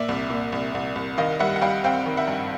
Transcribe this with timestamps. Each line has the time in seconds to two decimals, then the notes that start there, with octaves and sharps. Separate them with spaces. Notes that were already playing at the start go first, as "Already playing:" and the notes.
Already playing: A#2 D5 E5
0.08 C2
0.30 A#2
0.52 C2
0.75 C2
0.96 C2
1.18 D#3 D#5 F5
1.39 G3 E5 F#5
1.56 F#5
1.61 G3 F5 G5
1.84 C4 F5 G5
2.06 D#3
2.17 E5 F#5
2.27 G2